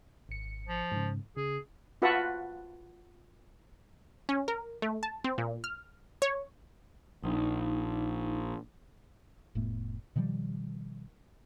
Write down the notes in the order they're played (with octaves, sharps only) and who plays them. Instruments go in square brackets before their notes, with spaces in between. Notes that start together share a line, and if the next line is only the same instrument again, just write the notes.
[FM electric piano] G#1 C#7
[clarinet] F3
[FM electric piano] G#2 C#3
[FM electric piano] C#3 [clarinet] G#4
[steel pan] F4 F#4 B4 E5 F#5 A5
[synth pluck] C#4
A#4
A3
A5
C4
A#2
F6
C#5
[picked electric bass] A#1 [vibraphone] D#4
[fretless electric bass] F1 A2 A3 B3
B2 D#3 F3 G3